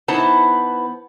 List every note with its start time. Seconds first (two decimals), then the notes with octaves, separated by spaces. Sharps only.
0.08 E3 B3 D#4 E4 C5 A5